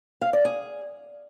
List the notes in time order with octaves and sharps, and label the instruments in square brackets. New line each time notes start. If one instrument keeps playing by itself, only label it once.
[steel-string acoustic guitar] F5
D5
G#4